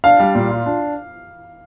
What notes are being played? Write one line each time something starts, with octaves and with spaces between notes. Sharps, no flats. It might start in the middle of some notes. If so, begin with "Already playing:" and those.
D4 F5
G3
A#2
F4
D4